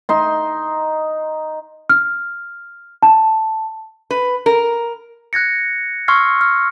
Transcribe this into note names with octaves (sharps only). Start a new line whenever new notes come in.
D#4 C6
F6
A5
B4
A#4
F#6 G#6 A#6 C#7
C6 C#6 E6 F6 G#6 C7
F6